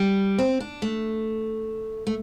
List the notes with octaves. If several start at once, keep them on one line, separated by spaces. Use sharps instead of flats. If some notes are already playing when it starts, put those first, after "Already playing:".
Already playing: G3
C4
D4
A3
A3